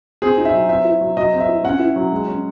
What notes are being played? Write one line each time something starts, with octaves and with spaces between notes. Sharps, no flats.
C4 G#4
D#4
E5
F#3
C4 E5
E4
F#3
F#3 D#5
C4
E5
E4
C#4 F#5
E4
F#3
G#3
C#4